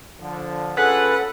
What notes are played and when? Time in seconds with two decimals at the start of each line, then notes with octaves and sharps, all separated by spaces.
0.20 D3 F3
0.77 C#4 F4 G#4 A4 B4 F#5